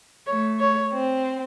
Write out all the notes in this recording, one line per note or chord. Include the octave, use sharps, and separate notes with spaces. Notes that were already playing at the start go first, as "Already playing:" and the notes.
A3 C#5
C#5
C4